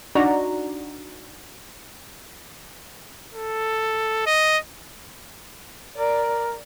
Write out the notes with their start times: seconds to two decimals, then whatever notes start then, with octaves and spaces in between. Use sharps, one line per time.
0.15 D4 D#4 F#4 D5 A#5
3.34 A4
4.26 D#5
5.98 A#4 D5